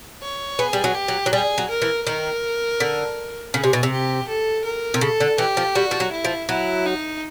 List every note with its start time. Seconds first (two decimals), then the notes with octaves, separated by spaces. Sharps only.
0.22 C#5
0.59 B3 G#4
0.73 G3
0.84 F#3
0.95 G4
1.08 F#3
1.26 F#3
1.33 G3 G#4
1.58 F#3
1.70 A#4
1.82 E3
2.06 D#3 A#4
2.80 D3
3.54 C#3 G#4
3.64 C3
3.73 B2
3.83 C3
3.92 G4
4.28 A4
4.64 A#4
4.94 C3
5.01 C#3 A4
5.20 D3
5.38 E3 G4
5.57 F3
5.75 G3 F#4
5.91 F3
6.00 F#3
6.12 E4
6.25 F3
6.49 F#3 E4
6.86 D#4